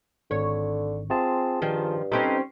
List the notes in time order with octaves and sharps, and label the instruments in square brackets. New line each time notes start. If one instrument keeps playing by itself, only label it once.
[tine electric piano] G#1 [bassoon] D3 [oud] C#5
[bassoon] C4 [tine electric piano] F4 G#4 A5
[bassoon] G2 [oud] D#3 F3
[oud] G3 C4 C#4 [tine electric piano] D#4 A4 B4